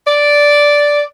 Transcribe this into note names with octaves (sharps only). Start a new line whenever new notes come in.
D5